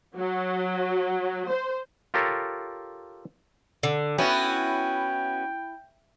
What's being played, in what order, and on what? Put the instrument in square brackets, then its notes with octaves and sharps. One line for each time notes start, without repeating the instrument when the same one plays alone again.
[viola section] F#3
C5
[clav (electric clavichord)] F4 G4 A4 A#4 C#5
[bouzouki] D3
[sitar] B3 C#4 F#4 [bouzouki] E4 [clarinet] G5